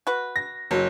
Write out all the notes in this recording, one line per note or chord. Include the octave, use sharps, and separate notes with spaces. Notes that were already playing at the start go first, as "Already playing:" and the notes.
F#4 B4
A#6
F#1 F#3